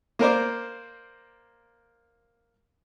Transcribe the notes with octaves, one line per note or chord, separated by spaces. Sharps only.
A#3 A#4 C5 D5